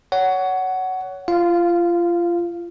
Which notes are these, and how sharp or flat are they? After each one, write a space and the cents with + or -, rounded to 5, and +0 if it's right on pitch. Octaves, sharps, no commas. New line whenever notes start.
C#5 +20 F#5 +10
F4 -25 F5 +0